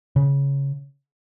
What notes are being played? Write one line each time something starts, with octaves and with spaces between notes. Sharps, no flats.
C#3